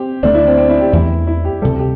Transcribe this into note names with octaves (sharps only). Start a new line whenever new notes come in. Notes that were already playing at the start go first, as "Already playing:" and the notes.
Already playing: C4 G4
D2 D3 A3 D4
E4
C4
C4
E4
G4
E2 E3 A3 E4
E4
G4
D2 C3 G3 A4
G4